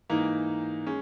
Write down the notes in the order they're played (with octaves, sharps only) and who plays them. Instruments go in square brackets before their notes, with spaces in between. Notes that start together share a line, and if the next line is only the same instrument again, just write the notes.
[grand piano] G#2 E3 A#3 D#4
G#3 C#4